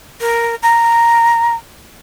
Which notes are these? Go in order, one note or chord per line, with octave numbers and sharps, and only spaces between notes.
A#4
A#5